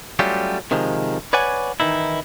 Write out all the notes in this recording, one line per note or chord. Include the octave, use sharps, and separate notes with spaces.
F#3 G3 A3 C#4 F4 G4
C3 D#3 F3 G#3
B4 C#5 D5 F#5 G#5
D#3 E3 D#4 E4